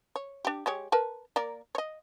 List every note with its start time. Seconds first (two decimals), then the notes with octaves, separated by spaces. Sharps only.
0.16 C#5
0.45 D4 G4
0.66 G#3 G4 C#5
0.92 A#4 B4 A5
1.36 A#3 A#4 D5
1.75 C#5 D#5